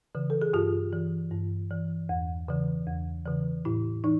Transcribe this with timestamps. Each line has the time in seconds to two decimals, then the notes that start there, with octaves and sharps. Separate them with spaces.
0.15 C#3 E3
0.30 A4
0.42 G#4
0.53 G2 F4 G4
0.92 E3
1.31 G2
1.71 E3
2.09 E2
2.48 C#3 E3
2.87 E2
3.26 C#3 E3
3.65 A2 E4
4.04 E3 D#4